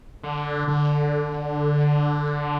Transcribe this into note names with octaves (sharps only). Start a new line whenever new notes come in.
D3
D3